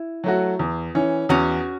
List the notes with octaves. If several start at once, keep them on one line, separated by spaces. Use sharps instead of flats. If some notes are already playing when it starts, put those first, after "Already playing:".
Already playing: E4
F#3 A3 F#4
E2
E3 C#4
E2 C#4 F#4